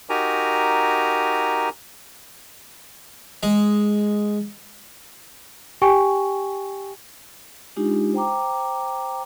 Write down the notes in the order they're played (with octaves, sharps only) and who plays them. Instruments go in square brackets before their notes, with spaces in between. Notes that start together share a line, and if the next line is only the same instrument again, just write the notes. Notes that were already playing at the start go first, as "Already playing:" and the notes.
[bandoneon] D#4 F#4 G4 A#4 G#5 A#5
[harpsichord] G#3
[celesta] G4 G5 G#5 C#6
[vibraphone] G#3 D4 D#4 F4 G4
C5 G5 A#5 D6